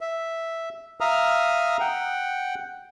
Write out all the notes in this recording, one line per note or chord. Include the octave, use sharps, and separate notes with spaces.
E5
E5 F5 A#5 D#6 F6
F#5 G5